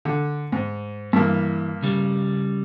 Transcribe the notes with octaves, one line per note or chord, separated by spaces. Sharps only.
D3
G#2
G2 E3 A#3
C#3 G3